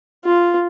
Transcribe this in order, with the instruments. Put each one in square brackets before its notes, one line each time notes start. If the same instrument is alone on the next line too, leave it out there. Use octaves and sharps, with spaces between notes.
[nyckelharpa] F4